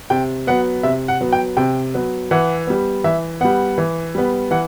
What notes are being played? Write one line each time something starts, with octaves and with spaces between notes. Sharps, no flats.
C3 G5
F#3 B3 F#5
C3 E5
F#5
F#3 B3
G5
C3 G5
F#3 B3
E3 F#5
G3 B3
E3 E5
G3 B3 F#5
E3
G3 B3
E3 F#5